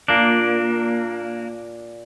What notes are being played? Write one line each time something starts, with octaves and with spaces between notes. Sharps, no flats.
A#2 A#3 D4